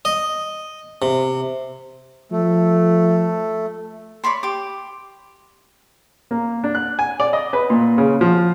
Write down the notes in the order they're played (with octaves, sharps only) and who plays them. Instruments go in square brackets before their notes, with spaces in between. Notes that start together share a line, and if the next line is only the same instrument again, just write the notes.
[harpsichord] D#5
C3
[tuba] F3 [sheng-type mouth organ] A3
[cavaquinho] C#5 D5 B5 C6
G4 D6
[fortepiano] A#3
D4
F#6
G#5
D5
D#5
B4
A#2
C#3
F3